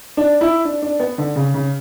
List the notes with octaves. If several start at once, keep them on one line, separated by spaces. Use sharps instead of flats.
D4
E4
D4
D4
B3
D3
C#3
C#3